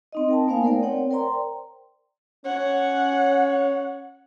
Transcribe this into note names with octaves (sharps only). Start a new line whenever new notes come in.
C4 D#4 D#5
A#4 G5 A5
A#3 B3 D#4 C5 F5 G#5
A3 A#4 C5 D5 G5
C4 C#5 F#5 G5
A#4 C5 D5 G5 A#5 C6
C#4 C#5 F#5